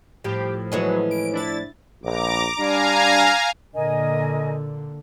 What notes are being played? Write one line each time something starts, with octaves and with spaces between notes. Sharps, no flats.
A2 F3 G4
E3 F#3 G#3 C#4 G#4
D7
D4 E4 A6
A#1 A#5 D6
G3 D4 F5 G#5 A#5
A#2 D3 A#4 D#5 G#5